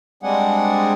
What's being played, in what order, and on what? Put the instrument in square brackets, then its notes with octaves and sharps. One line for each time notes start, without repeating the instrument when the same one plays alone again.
[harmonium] G3 G#3 C4 D4 G#4 F#5